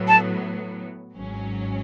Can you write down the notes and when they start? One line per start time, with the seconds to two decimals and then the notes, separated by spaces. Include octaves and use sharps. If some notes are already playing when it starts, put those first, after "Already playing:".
Already playing: A2 F#3 B3
0.08 A5
1.17 G#1 G#2 F#3 C#4